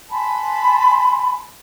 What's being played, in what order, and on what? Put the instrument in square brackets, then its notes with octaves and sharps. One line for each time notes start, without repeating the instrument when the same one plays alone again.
[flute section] G#5 A5 B5 C6